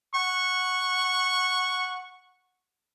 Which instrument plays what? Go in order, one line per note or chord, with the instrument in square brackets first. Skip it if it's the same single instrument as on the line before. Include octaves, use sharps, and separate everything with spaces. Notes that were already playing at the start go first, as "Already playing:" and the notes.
[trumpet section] F#5 C#6